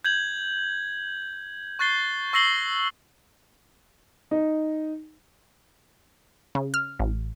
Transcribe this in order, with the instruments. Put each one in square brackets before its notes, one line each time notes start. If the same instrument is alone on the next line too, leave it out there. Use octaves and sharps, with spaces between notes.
[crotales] G6 G#6 F#7
C#6 F#6 A6 C7 G7
C#6 E6 A#6 C7 F#7 G7
[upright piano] D#4
[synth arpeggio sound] C#3
F6
A1